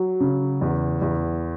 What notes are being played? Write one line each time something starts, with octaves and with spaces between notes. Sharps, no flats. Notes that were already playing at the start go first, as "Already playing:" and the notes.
Already playing: F#3
C#3
E2
E2